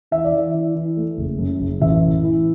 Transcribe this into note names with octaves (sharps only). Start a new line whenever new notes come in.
E3 E5
D5
E3 E5
E3
E3
A3
F#1
F#2
F#1
A1 E5
A2
E3